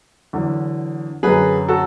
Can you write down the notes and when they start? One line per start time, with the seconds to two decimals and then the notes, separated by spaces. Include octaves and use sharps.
0.33 E2 D3 F#3
1.23 F#2 D3 F#3 G#4 B4
1.68 F#4 A4